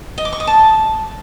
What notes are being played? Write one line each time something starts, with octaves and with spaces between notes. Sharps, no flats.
D#5
D6
C#6
D#5
A5